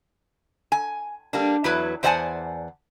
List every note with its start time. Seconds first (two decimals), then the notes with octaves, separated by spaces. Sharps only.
0.72 G#5
1.33 G3 A#3 D4
1.64 E2 F#3 E4 B4
2.03 E2 C5 D5 F#5 G#5 A5